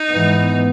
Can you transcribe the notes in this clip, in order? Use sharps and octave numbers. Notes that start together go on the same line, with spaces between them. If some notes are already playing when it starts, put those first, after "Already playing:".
Already playing: D#4
G#2 E3 B3